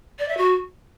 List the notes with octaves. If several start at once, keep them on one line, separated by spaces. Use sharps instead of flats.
D5
E5
F#4